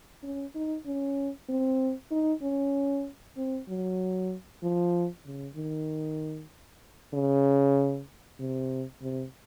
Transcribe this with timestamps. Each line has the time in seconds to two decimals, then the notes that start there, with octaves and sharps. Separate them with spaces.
0.23 C#4
0.55 D#4
0.86 C#4
1.49 C4
2.11 D#4
2.42 C#4
3.37 C4
3.69 F#3
4.63 F3
5.26 C#3
5.56 D#3
7.14 C#3
8.39 C3
9.02 C3